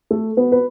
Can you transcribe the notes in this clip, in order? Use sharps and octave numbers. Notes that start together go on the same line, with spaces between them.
A3 A4
B3 B4
B4